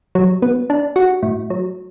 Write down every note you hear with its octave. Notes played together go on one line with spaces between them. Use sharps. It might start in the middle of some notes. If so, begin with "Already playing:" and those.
F#3
B3
D4
F#4
A2
F#3